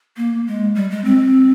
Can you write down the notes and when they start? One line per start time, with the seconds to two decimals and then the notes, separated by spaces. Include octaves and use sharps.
0.17 A#3
0.47 G#3
0.75 G3
0.91 G#3
1.05 C4